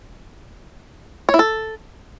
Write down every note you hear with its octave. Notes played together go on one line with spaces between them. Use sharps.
C#5
E4
A4